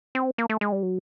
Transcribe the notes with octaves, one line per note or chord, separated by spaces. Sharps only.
C4
A#3
A3
G#3
G3
F#3